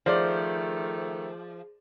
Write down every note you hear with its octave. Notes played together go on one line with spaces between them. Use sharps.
D#3 F3 A3 G#4 C5 D5